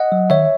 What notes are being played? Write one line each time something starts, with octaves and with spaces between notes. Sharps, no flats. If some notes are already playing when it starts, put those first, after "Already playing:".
Already playing: D#5 F#5
F#3
D#3 C#5 E5